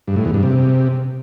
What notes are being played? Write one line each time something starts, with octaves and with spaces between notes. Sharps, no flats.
G2
A2
E2
G2
C3